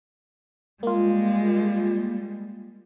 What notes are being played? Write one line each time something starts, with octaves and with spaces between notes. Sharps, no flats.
G3 G#3 A#3 F4